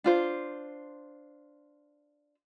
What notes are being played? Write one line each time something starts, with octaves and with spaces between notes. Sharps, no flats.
D4 F4 C5